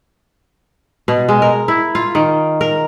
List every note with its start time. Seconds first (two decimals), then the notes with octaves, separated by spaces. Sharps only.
1.08 B2
1.29 G#3
1.42 A#4
1.68 E4
1.95 F4
2.15 D#3
2.61 A#4